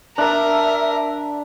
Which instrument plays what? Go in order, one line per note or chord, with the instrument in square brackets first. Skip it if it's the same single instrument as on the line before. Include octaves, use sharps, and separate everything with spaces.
[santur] D4 [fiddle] A#4 [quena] E5